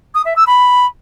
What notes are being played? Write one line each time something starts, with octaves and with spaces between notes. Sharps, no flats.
D#6
E5
E6
B5